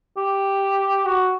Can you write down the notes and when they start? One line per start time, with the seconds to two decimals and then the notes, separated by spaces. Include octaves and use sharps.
0.17 G4
1.05 F#4